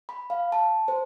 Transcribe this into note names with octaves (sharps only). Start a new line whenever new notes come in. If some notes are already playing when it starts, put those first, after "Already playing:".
B5
F5
A5
C5